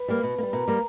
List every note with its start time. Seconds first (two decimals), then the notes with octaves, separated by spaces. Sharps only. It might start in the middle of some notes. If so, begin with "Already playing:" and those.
Already playing: B4
0.08 G3 A#3
0.23 B2
0.38 A#3
0.43 G3
0.53 B2 A#4
0.68 G3 A#3